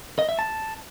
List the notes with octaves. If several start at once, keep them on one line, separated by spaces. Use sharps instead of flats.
D#5
E5
A5